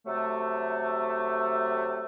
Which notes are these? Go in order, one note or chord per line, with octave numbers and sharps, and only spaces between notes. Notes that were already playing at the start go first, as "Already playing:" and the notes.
C3 F#3 A3